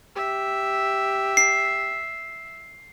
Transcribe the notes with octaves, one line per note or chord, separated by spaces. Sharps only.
G4 E5
C7